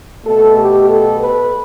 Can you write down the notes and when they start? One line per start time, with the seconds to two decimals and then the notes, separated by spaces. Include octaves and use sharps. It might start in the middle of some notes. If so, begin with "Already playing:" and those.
0.25 B2 A3 A4
0.56 G4
0.88 A4
1.19 B4